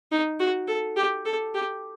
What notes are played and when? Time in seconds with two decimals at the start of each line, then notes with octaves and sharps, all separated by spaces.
0.12 D#4
0.40 F#4
0.68 A4
0.96 G4
1.26 A4
1.55 G4